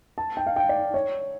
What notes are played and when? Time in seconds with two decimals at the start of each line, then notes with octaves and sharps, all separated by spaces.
0.18 A5
0.37 G5
0.46 F5
0.56 G5
0.69 D5
0.94 C#5